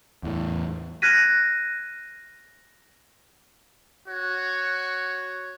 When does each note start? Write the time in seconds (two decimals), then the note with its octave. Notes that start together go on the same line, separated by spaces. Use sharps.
0.23 E2 A2
1.02 F6 F#6 G#6 A#6 B6 D#7
4.07 F#4 C#5